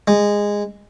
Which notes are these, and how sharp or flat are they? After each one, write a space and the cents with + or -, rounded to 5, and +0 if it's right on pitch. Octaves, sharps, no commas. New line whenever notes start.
G#3 -15